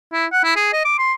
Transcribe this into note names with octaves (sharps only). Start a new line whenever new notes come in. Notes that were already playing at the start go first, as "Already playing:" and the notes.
E4
F#5
E4
G#4
D#5
D6
C6